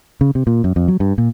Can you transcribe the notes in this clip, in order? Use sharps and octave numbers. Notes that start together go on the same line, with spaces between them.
C#3
C3
A#2
F#2
F2
F#3
G2
A#2